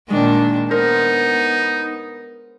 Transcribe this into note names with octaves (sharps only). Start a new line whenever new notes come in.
A#2 D#3 G#3 D4
B3 D#4 A#4 C5